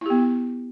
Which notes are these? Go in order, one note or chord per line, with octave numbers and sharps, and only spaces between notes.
B3 E4 G4